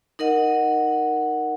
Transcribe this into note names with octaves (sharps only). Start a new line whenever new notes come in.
D#4 A#4 D#5 F#5